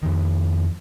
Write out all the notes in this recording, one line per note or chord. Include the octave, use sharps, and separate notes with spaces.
F2 D#3